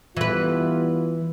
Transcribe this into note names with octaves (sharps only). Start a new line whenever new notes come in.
E3 G3 B3 F4 B4